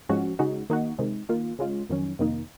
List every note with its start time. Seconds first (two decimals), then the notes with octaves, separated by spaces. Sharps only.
0.09 G#2 F3 G#3 C#4 F#4
0.39 C#3 G#3 D#4 F#4
0.70 D#3 A#3 D#4 F#4
0.98 C3 D#3 G#3
1.29 D#3 A#3 F4
1.59 C#3 G#3 C#4 F4
1.89 F2 D#3 F#3 C#4
2.19 F2 C3 D#3 A#3 D#4